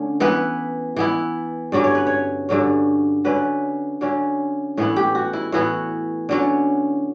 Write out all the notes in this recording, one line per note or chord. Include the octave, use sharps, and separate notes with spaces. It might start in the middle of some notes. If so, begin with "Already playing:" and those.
Already playing: D3 A3 C#4
E3 B3 E4 B4
E3 B3 E4
G2 D3 F#3 C#4 D5
C#5
B4
C#5
G2 D3 F#3 C#4
D3 F#3 C#4 B4
D3 F#3 C#4
A2 E3 B3 E4
G4
F#4
E4
A2 E3 B3 E4 F#4
D3 F#3 C#4